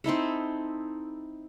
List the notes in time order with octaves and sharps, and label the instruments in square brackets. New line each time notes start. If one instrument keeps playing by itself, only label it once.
[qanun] C4 D#4 E4 A4